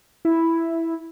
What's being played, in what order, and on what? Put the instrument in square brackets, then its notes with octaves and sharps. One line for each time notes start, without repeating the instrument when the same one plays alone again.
[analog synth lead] E4